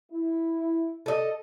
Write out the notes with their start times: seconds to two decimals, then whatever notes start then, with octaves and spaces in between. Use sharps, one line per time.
0.12 E4
1.06 A4 D#5